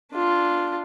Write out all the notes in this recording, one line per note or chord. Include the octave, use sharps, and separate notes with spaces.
D4 F4